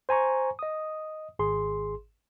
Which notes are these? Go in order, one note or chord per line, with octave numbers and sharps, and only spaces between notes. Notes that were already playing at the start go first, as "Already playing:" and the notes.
C5 G#5 A#5 C#6
D#5 D#6
G#1 G#4 C6